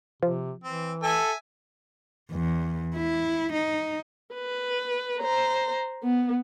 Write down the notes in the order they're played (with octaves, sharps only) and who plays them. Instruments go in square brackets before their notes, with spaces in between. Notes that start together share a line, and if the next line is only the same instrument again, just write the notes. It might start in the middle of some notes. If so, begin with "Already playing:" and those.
[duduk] C3 [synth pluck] F3
[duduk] E3 [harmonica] C4
[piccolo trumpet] A4 [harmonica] E5 G#5 A5
[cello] E2
E4
D#4
[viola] B4
C5 A#5
B3